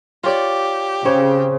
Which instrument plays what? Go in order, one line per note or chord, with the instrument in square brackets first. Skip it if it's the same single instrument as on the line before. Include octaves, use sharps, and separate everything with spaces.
[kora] F4 C#5 D5 [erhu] G4
[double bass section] C#3 [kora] C4 C5 C#5